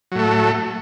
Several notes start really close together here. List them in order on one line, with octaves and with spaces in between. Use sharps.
F#3 A2 A3